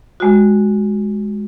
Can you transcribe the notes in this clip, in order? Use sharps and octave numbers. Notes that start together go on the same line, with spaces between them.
G#3 F#4